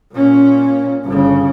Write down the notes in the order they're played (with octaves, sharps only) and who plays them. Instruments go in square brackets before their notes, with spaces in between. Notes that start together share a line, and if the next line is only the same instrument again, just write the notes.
[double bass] A#2 C#4
G1 C#3